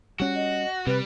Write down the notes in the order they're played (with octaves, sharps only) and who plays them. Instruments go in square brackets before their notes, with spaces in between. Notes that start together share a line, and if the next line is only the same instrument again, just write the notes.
[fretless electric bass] G3 C#4 [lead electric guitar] F#4
[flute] D#5
[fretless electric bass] C3 [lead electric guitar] G3 [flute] B4